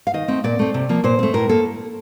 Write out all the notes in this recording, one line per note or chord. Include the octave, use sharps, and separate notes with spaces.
F5
D#3 D#5
A3 C4
A#2 D5
A3 C4
C3
F3 A#3
A#2 C5
A3 C4
A2 A#4
A#3 A4